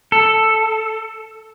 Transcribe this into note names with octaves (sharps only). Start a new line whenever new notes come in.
A4